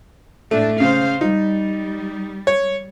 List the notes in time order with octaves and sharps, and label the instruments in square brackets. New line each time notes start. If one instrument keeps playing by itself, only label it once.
[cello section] A2 D4 [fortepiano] A3
[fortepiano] C#3 [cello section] C5 F5
[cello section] G3 [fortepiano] D#4
[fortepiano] C#5